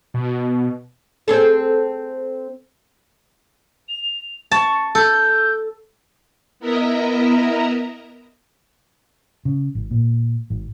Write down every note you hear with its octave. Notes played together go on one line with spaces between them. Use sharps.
B2
C4 G#4 A4
F7
A5 C#6
A4 G6
B3 E4 A#4 D#5 E5 A#5
C#3
G#1
A#2
G#1